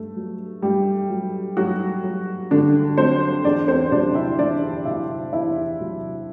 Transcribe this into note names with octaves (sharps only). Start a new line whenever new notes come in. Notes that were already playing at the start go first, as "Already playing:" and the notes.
Already playing: G2 A3
F#3
G2 G3 G4
F#3
G2 F#3 F#4
F#3
G2 D3 D4
F#3 C4 C5
E2 D4 D5
C4 C5
C3 F#3 D4 D5
E4 E5
E2 D4 D5
C3 F#3 E4 E5
E2 E4 E5
C3 F#3